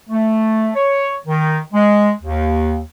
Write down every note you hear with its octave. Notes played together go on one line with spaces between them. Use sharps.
A3
C#5
D#3
G#3
D#2